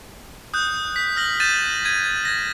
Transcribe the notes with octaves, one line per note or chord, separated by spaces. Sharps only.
D#6 F#6 G6
B6
F6 A#6 F#7
G6 A6 D#7 E7
G#6 D#7
G#6 A#6